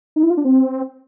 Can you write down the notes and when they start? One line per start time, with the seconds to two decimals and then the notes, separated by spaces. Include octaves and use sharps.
0.16 D#4
0.23 E4
0.30 F4
0.37 D4
0.45 C4